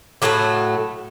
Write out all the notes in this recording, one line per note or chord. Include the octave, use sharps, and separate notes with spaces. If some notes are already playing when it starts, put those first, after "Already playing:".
A2 F#3 A3 A#3